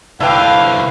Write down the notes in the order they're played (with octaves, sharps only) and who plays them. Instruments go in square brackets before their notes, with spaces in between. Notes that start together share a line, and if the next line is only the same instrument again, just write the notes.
[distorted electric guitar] C2 D3 [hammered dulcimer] E4 B4 [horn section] F5 [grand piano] G5 A5